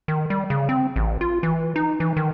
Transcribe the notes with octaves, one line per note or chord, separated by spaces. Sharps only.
D#3
G3
C#3
C4
A1
F4
E3
D#4
E3
D#3